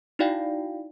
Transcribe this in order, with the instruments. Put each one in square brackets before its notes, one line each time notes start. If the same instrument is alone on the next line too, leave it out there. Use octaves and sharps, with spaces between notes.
[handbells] D#4 E4 F#4 D5 F5 G5